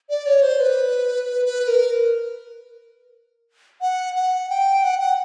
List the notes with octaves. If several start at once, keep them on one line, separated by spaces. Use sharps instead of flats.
D5
C#5
C5
B4
B4
A#4
F#5
F#5
G5
F#5
F#5